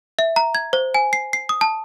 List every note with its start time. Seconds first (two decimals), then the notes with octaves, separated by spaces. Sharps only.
0.19 E5
0.36 A#5
0.55 G#6
0.73 C5
0.94 G#5
1.13 C7
1.33 C7
1.49 D#6
1.61 A5